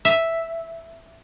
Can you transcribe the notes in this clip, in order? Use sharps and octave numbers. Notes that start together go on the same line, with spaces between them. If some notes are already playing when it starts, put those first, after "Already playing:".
E5